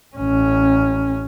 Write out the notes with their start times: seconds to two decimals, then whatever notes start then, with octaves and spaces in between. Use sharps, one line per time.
0.16 A1 C#4